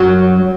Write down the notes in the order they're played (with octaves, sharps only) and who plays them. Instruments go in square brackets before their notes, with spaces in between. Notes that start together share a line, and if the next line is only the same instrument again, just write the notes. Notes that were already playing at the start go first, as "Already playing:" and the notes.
Already playing: [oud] F#2 F#3